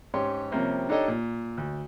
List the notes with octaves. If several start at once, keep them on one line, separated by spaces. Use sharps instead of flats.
G#2 C#4 G4 C#5 C6
C3 F3 G3 A#3 C4 C#4
D4 D#4 G4 A4 C#5 D#5
A#2
D2